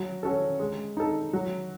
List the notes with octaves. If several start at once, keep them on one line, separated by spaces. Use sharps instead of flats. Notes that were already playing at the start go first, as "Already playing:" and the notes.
Already playing: F#3
C#4 F#4 A4
G#3
D#4 A4
F#3